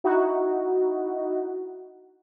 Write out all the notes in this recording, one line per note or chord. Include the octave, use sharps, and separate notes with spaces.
D#4 E4 F#4